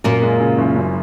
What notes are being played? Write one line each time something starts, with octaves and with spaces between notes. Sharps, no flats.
F#2 A#2 A#3
G#3
C#3
F#1
F#2